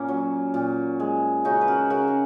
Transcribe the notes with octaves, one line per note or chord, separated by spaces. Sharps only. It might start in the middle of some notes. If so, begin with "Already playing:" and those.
Already playing: A#2 A#3 C#4
F#3
A#2
G#3
C#3 D#4 F#4
B4
F#4 A#4
C#3 F#4 A#4
G#4